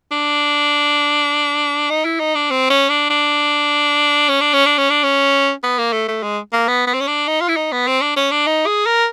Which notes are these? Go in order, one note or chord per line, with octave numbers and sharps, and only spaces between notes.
D4
D#4
E4
D#4
D4
C4
C#4
D4
D4
C#4
D4
C#4
D4
C#4
D4
C#4
B3
A#3
A3
A3
G#3
A#3
B3
B3
C4
C#4
D4
D#4
F4
E4
D#4
B3
C4
D4
C#4
D4
D#4
G#4
A#4